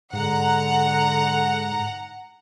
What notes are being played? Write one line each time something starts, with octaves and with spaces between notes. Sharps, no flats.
G#2 D3 F#5 A#5